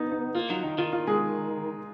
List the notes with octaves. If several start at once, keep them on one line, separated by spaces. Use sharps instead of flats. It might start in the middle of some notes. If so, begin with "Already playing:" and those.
Already playing: B3 D#4
D#4
A#3 F4
F#3 D#4
D#3 D#4
D#3 F4
F4
G#3 G#4